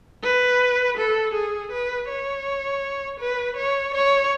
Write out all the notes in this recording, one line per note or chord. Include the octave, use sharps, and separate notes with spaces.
B4
A4
G#4
B4
C#5
B4
C#5
C#5